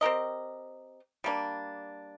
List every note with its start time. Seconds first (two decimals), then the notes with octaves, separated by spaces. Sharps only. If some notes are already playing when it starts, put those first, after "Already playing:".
0.01 C4 G4 A#4 D#5
1.24 G3 A#3 D4